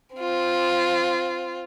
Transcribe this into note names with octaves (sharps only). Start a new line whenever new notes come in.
C4 F4